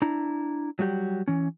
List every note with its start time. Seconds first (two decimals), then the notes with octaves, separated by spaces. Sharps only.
0.02 D4 E4 A#5
0.79 F#3 G3 F#4 G4
1.28 E3 C#4